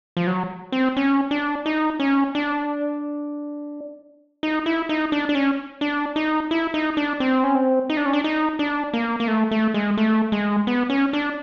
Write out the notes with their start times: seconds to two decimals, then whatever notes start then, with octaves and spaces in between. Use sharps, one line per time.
0.17 F3
0.27 F#3
0.72 C4
0.97 C#4
1.31 D4
1.66 D#4
2.00 C#4
2.35 D4
4.43 D#4
4.66 E4
4.89 D#4
5.12 D4
5.29 D4
5.35 C#4
5.81 D4
6.16 D#4
6.51 E4
6.74 D#4
6.97 D4
7.20 C4
7.44 C#4
7.55 C4
7.90 D#4
7.97 D4
8.06 C#4
8.13 D4
8.24 D#4
8.59 D4
8.94 A#3
9.20 A#3
9.28 A3
9.51 A3
9.74 G#3
9.97 A3
10.32 G#3
10.67 B3
10.90 C#4
11.13 D4